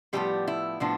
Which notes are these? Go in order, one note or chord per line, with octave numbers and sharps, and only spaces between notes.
A2 F3 G3 B3 G4
E4
A2 F3 B3 D4